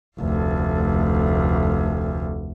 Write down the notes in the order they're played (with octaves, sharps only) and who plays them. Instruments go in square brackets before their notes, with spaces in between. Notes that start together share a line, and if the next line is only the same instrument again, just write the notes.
[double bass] F1 D2